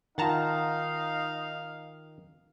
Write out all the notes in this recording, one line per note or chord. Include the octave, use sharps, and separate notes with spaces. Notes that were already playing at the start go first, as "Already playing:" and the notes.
D#3 D#4 F4 F5 F#5 A5 A#5